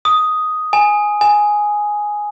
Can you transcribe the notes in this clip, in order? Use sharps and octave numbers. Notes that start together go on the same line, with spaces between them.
D#6
G#5
G#5